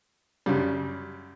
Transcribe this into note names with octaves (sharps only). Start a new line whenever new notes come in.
F#2 C#3 G3